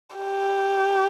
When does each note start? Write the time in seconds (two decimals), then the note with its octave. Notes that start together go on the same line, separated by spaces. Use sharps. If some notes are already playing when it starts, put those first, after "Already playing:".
0.17 G4